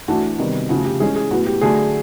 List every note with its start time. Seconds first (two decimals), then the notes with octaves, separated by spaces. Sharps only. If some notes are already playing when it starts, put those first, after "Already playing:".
0.08 E3 A3 D4 F#4
0.39 C3 D#3 G3 B3
0.69 C#3 F3 A3 F#4
0.85 G4
1.00 E3 G#3 C#4 G#4
1.16 G#4
1.31 A2 F#3 B3 F#4
1.46 G4
1.61 D3 F#3 A3 G#4